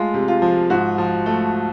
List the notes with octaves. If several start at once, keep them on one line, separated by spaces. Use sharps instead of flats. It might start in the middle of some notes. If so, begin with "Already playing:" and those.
Already playing: G#3 A3 F4
C3
F4
F3
G#2 F#4
F3
A3